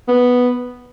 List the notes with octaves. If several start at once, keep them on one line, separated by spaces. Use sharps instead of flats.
B3